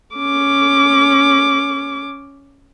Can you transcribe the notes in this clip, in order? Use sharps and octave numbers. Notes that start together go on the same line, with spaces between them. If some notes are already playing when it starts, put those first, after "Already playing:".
C#4 D6